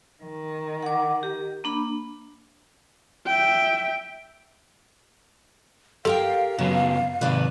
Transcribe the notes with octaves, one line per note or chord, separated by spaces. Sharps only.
D#3
F#5 D6
G4
A#3 D4 B5
E5 G5
G4 A4 A#4 F5 G5
F#2 C#3 F#3 B3
G#2 C3 D#3 B4 D5